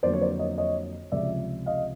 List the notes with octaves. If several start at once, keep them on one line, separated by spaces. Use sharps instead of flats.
F2 D3 F#3 A#3 C5 D5
C#5
C5 D5
C#5 D#5
C#5 D#5
C#2 C3 F3 D5 E5
D#5 F5